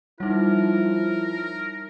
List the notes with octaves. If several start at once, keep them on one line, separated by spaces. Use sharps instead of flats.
F3 G3 D#4 E4 A#4